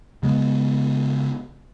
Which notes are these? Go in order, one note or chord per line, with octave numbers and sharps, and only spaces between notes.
C#3 G#3 B3